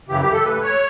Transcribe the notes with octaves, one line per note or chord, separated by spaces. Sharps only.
F#2 C#3 E3 G4
G4
A4
A2 E3 A3 B4
C#5